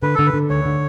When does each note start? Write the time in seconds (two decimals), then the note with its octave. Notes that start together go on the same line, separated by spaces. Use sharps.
0.03 D3 B4
0.15 D3 A4
0.26 B4
0.34 D3
0.50 D2 C#5
0.65 D3